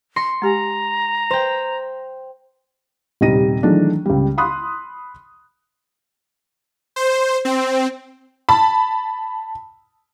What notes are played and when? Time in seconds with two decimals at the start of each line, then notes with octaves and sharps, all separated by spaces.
0.16 C6 A#6 C#7
0.42 G#3 G4 G#5 A#5
1.31 C5 G5
3.21 D#1 C3 G3 D#4 A#6 D#7
3.63 D#3 E3 F#3 G#3 A3 D4
4.06 C#2 G3
4.38 B5 C6 D#6 F#6
6.96 C5
7.45 C4
8.49 A5 B5